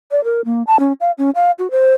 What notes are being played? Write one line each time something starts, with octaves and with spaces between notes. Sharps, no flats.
D5
A#4
A#3
A5
C#4
F5
C#4
F5
F#4
C5